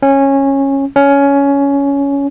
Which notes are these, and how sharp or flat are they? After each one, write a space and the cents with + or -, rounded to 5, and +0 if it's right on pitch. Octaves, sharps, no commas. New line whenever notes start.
C#4 -15
C#4 +15